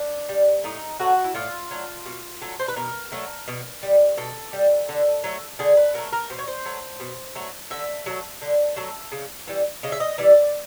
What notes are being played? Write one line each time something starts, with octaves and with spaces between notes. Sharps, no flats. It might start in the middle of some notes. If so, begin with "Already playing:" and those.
Already playing: D4
G3
A2 D#4
F#3 A3 F#4
E4
A2 F4
F#3 A3
B2
F#3 A3
C5
B4
B2 A#4
F#3 A3
B2
G3
B2 A4
G3
D3
F#3 A3
D3 G#4
B4
F#3 A3 A#4
A#4
B2 C5
C#5
C5
F#3 A3
B2
F#3 A3
D3 E5
F#3 A3
D3
F#3 A3
C#3
E3 G3
C#3 D#5
E5
D#5
E3 G3 D5